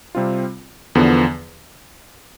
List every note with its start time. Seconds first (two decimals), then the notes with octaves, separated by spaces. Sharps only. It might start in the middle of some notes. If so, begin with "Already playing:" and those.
0.15 C3 G3 C4 F4
0.95 E2 D3 F3 B3